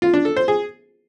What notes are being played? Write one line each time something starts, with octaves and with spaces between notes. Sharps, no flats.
F4
D4
A4
C5
G#4